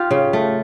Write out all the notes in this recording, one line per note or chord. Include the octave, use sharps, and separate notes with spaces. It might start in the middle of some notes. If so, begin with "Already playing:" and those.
Already playing: F4 G4
C#3
A3